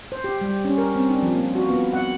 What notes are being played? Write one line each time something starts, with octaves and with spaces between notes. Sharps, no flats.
C5
G4
G3
C#4
A#4
C4
D4
F3
A#3
F#4
B3
F#5